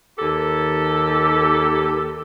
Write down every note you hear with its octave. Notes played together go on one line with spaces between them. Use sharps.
D#2 G4 A4